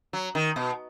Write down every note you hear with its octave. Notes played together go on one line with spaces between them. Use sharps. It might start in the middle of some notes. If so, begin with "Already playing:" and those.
F#3
D#3
B2